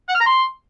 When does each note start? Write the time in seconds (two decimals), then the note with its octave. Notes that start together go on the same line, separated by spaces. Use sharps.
0.09 F#5
0.15 F6
0.21 A#5
0.26 C6